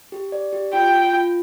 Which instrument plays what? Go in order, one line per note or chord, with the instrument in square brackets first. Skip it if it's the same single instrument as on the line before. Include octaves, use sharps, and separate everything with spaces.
[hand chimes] G4
D5
G4
[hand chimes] F4 [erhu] G5
[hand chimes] F4
F4